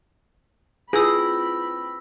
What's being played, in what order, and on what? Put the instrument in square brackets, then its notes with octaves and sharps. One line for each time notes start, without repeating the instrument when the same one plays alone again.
[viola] C4 B5 [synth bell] E4 F4 B4 [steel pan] G#4 [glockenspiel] E6 A#6